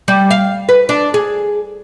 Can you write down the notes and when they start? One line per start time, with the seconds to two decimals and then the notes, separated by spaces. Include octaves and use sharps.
0.08 G3
0.31 F5
0.69 B4
0.89 D4
1.14 G#4